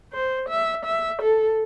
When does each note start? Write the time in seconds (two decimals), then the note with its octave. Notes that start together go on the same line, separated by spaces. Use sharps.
0.13 C5
0.49 E5
0.85 E5
1.22 A4